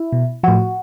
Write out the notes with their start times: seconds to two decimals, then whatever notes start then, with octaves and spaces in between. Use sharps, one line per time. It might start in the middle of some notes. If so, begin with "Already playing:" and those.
Already playing: E4
0.13 B2
0.43 A2 F3 F#4